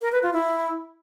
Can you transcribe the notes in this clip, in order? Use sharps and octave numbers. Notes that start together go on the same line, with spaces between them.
A#4
B4
F4
E4